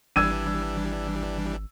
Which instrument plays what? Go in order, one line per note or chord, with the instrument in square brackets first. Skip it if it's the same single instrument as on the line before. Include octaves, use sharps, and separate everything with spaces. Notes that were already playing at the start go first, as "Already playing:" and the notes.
[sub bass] G#1 [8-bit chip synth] E3 G3 D4 [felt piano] E6 G#6 D#7